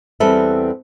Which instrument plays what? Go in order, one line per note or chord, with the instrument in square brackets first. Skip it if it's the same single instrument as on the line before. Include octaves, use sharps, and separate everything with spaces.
[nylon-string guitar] E2 G3 C4 A4 B4 E5